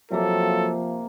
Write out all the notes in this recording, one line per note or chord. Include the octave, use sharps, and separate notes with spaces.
C3 F3 F#3 A#3 A4